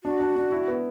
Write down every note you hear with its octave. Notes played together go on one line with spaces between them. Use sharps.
D4 F#4
D4
D4
E4
B3